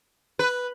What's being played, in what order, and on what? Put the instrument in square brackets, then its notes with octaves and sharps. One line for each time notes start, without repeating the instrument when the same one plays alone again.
[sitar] B4